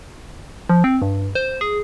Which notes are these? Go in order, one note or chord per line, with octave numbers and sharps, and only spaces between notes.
F3
C4
G2
C5
G#4